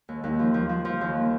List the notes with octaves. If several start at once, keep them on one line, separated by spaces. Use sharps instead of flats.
D#2
D#2
F3
F3
F3
F3
D#2